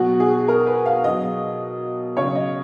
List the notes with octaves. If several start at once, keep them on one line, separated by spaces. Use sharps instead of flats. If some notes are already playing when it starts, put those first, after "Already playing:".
Already playing: B2 F#3 F#4
G#4
A#4
B4
F5
B2 F#3 D#5
C#3 F#3 C#5
D#5